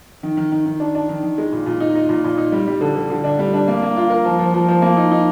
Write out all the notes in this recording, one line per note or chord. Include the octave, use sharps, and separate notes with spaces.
D#3
D#3
D#3
D#3
D4
D4
D#3
D#3
G#3
A#2
A#2
D#4
D#4
A#2
A#2
D#4
G3
G3
D3
D3
D3
D4
G3
D4
A#3
A#3
F4
A#4
F3
F3
F3
F3
A#3
D#4
D#4